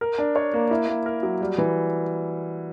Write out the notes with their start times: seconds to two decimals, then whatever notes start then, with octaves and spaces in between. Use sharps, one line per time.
0.01 A#4
0.18 D4
0.36 C#5
0.54 A#3
0.71 E4
0.88 A#3
1.06 A#4
1.23 F#3
1.41 G3
1.58 E3